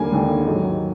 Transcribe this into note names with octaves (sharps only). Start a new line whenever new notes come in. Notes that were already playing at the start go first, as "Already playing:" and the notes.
Already playing: D#2 D3 G3 A#3 G#5
D#2 D3 G3 A#3
G#2 D#3 F#3